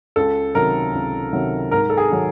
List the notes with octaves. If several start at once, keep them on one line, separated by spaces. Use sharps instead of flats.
C#2 A4
C3 D#3 F#3 A#4
C#2
C3 D#3 F#3
G#2 A#4
A4
G#4
D#3 F#3